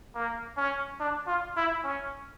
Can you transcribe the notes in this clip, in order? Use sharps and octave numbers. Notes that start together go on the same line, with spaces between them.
A#3
C#4
D4
F4
E4
C#4